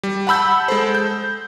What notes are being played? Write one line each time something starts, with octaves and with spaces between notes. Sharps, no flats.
G3
F#5 A5 B5 E6 G6
G#3 A4 C5
G6